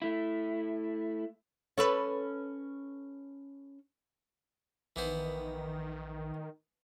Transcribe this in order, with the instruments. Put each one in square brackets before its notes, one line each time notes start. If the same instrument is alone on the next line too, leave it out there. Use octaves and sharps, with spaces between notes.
[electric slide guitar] A3 E4
[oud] C#4 A4 B4
[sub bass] A#1 [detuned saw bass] D#3 [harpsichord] E3 B3 C5